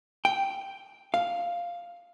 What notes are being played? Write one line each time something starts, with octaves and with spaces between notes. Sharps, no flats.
G5
F5